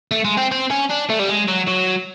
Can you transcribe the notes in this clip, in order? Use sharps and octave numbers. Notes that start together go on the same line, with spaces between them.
A3
G#3
C4
C4
C#4
D4
A3
G3
G#3
F#3
F#3